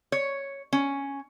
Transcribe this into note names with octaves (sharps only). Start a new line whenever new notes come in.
C#5
C#4